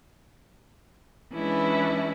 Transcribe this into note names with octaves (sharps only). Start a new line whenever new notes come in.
E3 G#3 C#4 D4 E4 B4